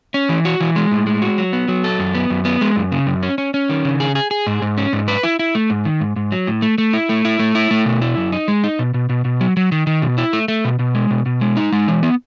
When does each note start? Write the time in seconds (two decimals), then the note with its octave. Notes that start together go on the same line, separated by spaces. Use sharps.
0.14 C#4
0.29 E3
0.45 F#4
0.60 E3
0.76 G#3
0.92 A2
1.07 G#3
1.22 F#4
1.38 F#3
1.53 B3
1.68 F#3
1.84 A4
1.99 F#2
2.15 B3
2.30 F#2
2.45 B3
2.61 G#3
2.76 F#2
2.92 C#3
3.07 F#2
3.23 C#4
3.38 C#4
3.54 C#4
3.69 D#3
3.85 C#3
4.00 G#4
4.15 G#4
4.31 G#4
4.47 G#2
4.62 G#2
4.77 C#4
4.93 G#2
5.08 B4
5.23 E4
5.39 E4
5.55 A3
5.70 G#2
5.85 D#3
6.01 G#2
6.16 G#2
6.32 F#3
6.47 A2
6.62 A3
6.78 A3
6.93 E4
7.09 A3
7.25 E4
7.39 A3
7.55 E4
7.71 A3
7.86 B2
8.02 E4
8.17 F#2
8.32 D#4
8.48 G#3
8.64 D#4
8.79 B2
8.94 B2
9.09 B2
9.25 B2
9.41 F#3
9.57 F#3
9.72 D#3
9.87 D#3
10.02 B2
10.18 E4
10.33 A3
10.48 A3
10.65 B2
10.79 B2
10.95 G#3
11.11 B2
11.26 B2
11.41 G#3
11.57 D#4
11.72 G#3
11.88 E3
12.03 B3